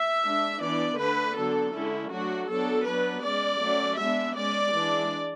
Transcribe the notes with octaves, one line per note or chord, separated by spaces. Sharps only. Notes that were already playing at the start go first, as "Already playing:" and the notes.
Already playing: E5
G#3 D4
E3 B3 D4 D5
D3 A3 D4 B4
D3 F#3 B3 D4 A4
D3 G#3 C#4 E4
F#3 A3 D4 F#4
F#3 B3 D4 A4
F#3 B3 D4 B4
G#3 C#4 D5
F#3 A3 C#4
G#3 B3 D4 E5
G#3 C#4 D5
E3 G#3 D4